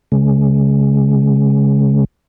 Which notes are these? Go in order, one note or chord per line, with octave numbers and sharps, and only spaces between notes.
C#3 G#3